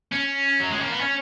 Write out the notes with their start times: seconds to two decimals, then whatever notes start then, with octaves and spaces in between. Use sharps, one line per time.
0.12 C#4
0.60 F#3
0.70 G#3
0.80 A#3
0.90 B3
1.01 C#4